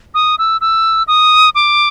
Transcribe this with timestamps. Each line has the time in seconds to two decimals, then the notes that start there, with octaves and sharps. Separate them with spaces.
0.14 D#6
0.39 E6
0.61 E6
1.08 D#6
1.55 D6